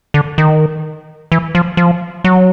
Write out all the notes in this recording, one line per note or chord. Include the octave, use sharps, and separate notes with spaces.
D3
D#3
E3
F3
F3
F#3